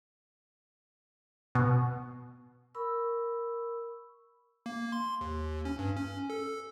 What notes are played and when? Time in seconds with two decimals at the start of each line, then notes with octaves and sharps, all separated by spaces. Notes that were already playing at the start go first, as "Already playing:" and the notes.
1.55 B2
2.75 A#4 B5 C#6 E6
4.66 A#3
4.92 C6
5.21 D#2
5.65 C#4
5.79 G2
5.96 C#4
6.30 A4